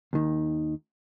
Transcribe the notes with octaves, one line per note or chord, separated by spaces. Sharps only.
D#2 D#3